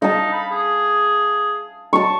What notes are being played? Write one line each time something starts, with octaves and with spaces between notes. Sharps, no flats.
D#4 F5 A5
B5
G#4
A5 C#6